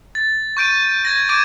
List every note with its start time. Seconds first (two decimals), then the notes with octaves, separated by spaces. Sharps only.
0.15 A6
0.57 C#6 G6 D7 D#7
1.05 G#6 A#6
1.29 D6 G#6 D7 D#7